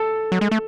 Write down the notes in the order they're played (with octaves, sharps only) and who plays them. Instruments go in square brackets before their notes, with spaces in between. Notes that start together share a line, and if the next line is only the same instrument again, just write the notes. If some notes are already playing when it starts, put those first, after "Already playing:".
Already playing: [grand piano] A4
[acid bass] F#3
G#3
A3